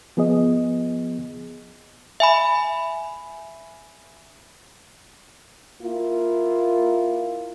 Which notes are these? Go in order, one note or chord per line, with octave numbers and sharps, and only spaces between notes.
F3 B3 G#4 D#5
E5 G#5 B5
A#3 E4 F4